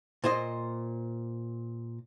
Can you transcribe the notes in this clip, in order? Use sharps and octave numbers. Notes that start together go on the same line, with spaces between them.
A#2 C5 D#5